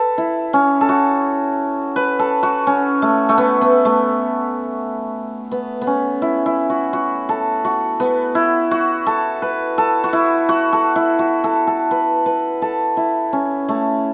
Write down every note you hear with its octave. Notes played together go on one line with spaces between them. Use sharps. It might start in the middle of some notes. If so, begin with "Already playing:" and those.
Already playing: A4 B4
E4
C#4
A4
F#4
B4
A4
F#4
C#4
A3
A3
B3
B3
A3
B3
B3
C#4
E4
E4
F#4
F#4
A4
F#4
B3
E4
F#4
A4
B4
A4
F#4
E4
F#4
A4
E4
F#4
A4
A4
B4
B4
A4
E4
C#4
A3